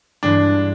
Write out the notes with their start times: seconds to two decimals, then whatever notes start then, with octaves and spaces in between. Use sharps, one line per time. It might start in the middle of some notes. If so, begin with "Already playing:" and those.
0.23 G2 E3 G#3 D4